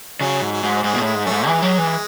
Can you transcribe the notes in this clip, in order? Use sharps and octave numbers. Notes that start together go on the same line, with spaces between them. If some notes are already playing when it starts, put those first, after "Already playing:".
C#3 F#3
G#2
F#3
G#2
G#2 G#3
B2
A2
G#3
G#2
F#2 A3
G#2
E3 G#3
F#3
E3